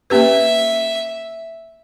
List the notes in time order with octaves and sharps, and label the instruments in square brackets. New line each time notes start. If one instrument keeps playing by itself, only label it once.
[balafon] A#3 C#4 G4 B4 [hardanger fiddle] E5